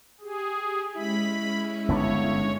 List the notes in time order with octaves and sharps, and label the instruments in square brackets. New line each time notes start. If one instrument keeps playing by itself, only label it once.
[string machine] G4 [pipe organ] G#4
[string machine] G#3 C#4 [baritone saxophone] E4 [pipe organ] B5
[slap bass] G1 B3 D4 [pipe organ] C#5